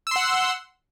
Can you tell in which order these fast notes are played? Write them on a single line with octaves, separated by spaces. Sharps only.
E6 C6 F#5